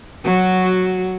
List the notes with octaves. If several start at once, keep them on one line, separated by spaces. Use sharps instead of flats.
F#3 F#4